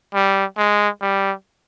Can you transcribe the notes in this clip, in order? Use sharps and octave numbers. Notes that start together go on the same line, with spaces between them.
G3
G#3
G3